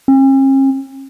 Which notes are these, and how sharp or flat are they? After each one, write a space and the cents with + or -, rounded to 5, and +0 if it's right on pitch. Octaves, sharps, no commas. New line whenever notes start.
C#4 -45